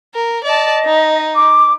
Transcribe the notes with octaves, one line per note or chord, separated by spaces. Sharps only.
A#4
D5 D#5 A5
D#4
D6